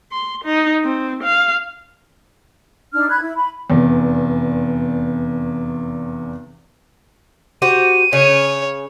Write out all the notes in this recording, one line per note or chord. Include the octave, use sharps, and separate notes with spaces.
C6
D#4
C4
F5
D4 D#4 F6
B5 F#6 G#6
E4
B5
F1 E2
F#4 G4 C5 D#7
C#3 C#5